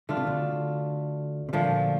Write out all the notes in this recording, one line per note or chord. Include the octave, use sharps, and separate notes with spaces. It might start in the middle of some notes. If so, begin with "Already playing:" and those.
D3 A3 D4 F4
C3
D2 D3
C3
D2 A#2 D3 F3 A3